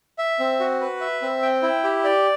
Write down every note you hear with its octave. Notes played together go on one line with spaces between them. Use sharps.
E5
C4
F#4
B4
E5
C4
G5
E4
G4
D5